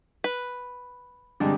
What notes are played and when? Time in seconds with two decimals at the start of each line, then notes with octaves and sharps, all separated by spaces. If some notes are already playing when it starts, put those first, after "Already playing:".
0.24 B4
1.40 G1 C3 G3 G#3 D4